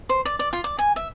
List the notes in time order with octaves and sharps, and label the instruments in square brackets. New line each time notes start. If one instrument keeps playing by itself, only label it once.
[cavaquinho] C5
D5
D5
F4
D5
G#5
E5